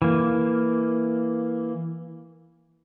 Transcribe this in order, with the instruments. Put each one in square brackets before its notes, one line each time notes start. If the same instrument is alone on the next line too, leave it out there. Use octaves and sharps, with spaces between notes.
[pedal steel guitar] E3 A#3